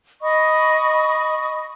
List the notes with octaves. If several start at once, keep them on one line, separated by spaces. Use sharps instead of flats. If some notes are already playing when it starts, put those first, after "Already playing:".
D#5 B5 C#6 D#6